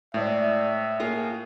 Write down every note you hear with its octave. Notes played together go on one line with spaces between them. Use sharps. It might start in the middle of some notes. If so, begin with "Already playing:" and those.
A2 G#3 C5 D5 E5
A#3 F4 G#4